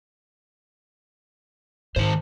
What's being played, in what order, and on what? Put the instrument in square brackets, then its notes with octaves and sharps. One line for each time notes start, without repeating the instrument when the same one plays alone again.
[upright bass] G#2 [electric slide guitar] D#3 C5